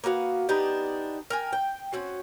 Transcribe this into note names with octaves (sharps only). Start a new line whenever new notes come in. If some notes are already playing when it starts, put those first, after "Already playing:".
A#3 B3 F#4 F5
B3 D4 D#4 G4
A#4 G5 G#5
G5
C4 C#4 F#4